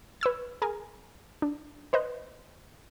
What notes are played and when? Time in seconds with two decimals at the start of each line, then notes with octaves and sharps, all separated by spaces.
0.21 B4 C#6 E6 G#6
0.62 G#4 A#4 G#5
1.42 D4
1.93 B4 C5 D#5 F#6